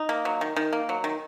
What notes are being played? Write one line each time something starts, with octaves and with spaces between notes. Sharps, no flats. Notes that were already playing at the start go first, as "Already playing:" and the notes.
Already playing: D#4
A#3
F#3
D#3
D#3
A#3
F#3
D#3